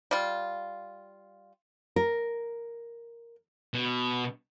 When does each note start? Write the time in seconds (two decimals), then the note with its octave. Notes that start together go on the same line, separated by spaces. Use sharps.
0.11 G3 F4
1.96 A#4
3.74 B2